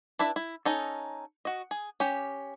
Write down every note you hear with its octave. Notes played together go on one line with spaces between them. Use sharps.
D4 E4 B4 E5
E4
C#4 D#4 A4
F#4 D#5
G#4
C#4 G4